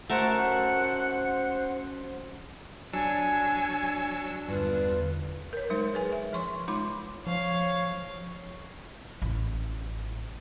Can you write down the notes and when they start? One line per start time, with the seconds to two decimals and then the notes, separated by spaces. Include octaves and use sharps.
0.10 F#2 A3 F#4 A#4 C5 F#5 A5 C#6
2.93 F#3 D4 G#5 E6 C#7
4.49 E2 G2 D3 F4 B4
5.53 A#4 C#5
5.70 F#3 G#3 D#4 A#4 C5
5.94 G#4 B4 G#5
6.12 E5
6.33 F3 C#5 C6 C#6
6.68 G#3 D#4 F4 B5 C6 D6
7.27 F3 C#5 F5
9.22 A1